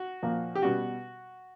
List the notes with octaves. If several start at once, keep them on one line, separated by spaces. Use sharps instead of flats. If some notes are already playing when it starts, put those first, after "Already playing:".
Already playing: F#4
A#2 F3 A#3
G4
B2 G3 B3 F#4